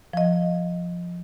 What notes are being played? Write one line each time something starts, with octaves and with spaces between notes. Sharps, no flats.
F3 D#5